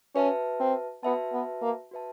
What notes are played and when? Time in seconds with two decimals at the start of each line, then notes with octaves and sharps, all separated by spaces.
0.15 C#4 F#4 B4 E5 A5
0.60 C4
1.03 B3 F#4 B4 E5 A5
1.33 B3
1.62 A#3
1.91 F#4 B4 E5 A5